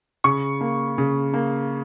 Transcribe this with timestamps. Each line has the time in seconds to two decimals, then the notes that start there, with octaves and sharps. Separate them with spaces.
0.24 C#3 C#6
0.61 A#3
0.98 C#3
1.33 A#3